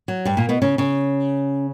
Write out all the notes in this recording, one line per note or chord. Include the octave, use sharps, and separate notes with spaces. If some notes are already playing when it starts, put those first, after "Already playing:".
F#3
G2 G3
A#2 A#3
B2 B3
C#3 C#4
C#3 C#4